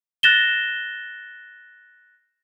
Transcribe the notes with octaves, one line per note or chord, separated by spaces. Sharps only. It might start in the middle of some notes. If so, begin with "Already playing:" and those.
F#6 A6 A#6 E7 G7